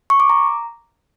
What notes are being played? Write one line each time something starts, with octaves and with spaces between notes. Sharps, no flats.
C#6
D6
A#5